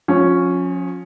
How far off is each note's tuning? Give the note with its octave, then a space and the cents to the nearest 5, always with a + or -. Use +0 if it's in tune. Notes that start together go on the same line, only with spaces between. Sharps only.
F3 +35 C#4 +0